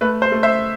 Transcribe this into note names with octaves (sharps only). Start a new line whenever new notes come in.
A3 B4
C5
A3
C5 E5